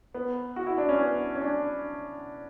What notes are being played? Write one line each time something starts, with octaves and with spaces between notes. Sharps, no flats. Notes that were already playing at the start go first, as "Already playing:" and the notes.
B3
F#4
E4
D4
C#4
B3
C#4
D4